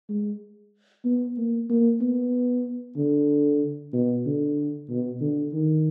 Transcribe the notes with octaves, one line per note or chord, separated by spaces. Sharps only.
G#3
B3
A#3
A#3
B3
D3
B2
D3
B2
D3
D#3